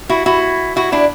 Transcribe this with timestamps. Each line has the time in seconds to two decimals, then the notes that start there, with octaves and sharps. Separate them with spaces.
0.09 E4 F#4
0.26 E4 F#4
0.76 E4 F#4
0.92 D4 E4